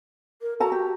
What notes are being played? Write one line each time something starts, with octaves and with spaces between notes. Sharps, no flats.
A#4
F#4 A4 A5 A#5
G4